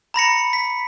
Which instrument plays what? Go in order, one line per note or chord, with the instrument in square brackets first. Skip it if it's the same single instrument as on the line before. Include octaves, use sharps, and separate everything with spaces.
[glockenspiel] A#5 B5 A#6 C#7
B6